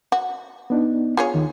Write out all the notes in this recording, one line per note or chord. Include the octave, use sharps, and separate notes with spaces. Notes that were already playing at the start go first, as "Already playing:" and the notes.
F#4
B3 D4 D#4
F4 G#4 C#5
D#2 D#3